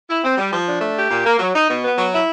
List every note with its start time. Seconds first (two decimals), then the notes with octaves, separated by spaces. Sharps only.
0.09 E4
0.23 C4
0.37 G3
0.52 F3
0.68 D4
0.81 A3
0.95 G4
1.10 A#2
1.25 A#3
1.39 F#3
1.54 D#4
1.69 B2
1.84 B3
1.97 F#3
2.13 E4